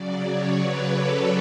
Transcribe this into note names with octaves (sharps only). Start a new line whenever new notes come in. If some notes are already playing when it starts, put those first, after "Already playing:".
Already playing: C#3 F#3 D5
C#5
B4
A4